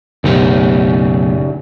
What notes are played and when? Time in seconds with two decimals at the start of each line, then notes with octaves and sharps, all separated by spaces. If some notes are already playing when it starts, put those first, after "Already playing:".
0.24 F#1 B1 C#3 D#4 G4